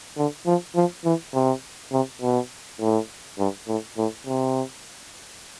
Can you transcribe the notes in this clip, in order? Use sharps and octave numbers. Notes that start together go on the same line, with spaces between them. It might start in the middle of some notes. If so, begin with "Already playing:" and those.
D3
F3
F3
E3
C3
C3
B2
A2
G2
A2
A2
C3